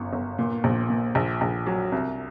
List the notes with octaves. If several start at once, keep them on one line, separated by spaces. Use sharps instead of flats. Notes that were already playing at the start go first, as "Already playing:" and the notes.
Already playing: G1 F#2
G1
A#2
A#1
A#2
A#1
A#1
F#3
C2